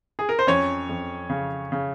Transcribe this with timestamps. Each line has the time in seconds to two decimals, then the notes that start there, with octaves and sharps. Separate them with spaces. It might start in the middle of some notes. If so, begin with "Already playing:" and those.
0.19 G#4
0.29 A#4
0.39 C5
0.47 F2 C#4 C#5
0.89 F2
1.30 C#3
1.72 C#3